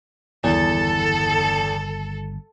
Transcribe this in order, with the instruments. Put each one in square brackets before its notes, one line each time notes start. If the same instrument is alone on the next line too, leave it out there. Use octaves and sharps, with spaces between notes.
[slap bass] G1 D#3 G3 [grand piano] E2 [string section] A4